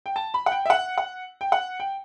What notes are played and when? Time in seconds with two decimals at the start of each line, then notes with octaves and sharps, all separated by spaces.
0.06 G5
0.16 A5
0.34 B5
0.46 F#5
0.52 G5
0.66 E5
0.70 F#5
0.98 F#5
1.41 G5
1.52 F#5
1.80 G5